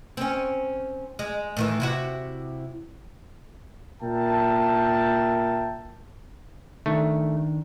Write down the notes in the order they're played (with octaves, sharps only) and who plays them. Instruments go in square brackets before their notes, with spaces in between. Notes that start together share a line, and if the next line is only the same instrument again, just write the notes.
[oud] C4 C#4
G#3
A2 D#3 E3
C3 E4 F#4
[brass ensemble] A#2 A#4 E5 G5 A5
[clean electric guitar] D#3 D4 [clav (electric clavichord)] A3